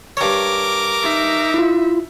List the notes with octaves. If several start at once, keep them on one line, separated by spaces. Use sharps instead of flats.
G2 A#4 C#5 D6
D#4 E5
E4 F4